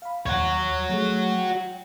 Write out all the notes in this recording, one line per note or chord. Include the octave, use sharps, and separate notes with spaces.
F5 B5
D#2 F#4 C#5
F#3 A3 G#4
G5